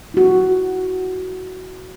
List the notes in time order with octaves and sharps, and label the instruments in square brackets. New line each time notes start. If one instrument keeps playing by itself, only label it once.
[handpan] E4 F#4